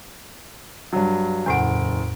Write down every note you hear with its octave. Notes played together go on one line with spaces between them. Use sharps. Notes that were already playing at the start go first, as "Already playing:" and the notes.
G2 F#3
F#1 E2 A2 F#5 D7